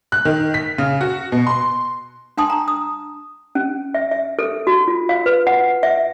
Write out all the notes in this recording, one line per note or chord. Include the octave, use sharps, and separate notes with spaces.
F#6
D#3
B6
C#3
F#4
B2
C6
D4 G5 A5 C6 D#6
A#5
D#6
C#4
E5
E5
A4
F#4
F4
F5
B4
F#5
E5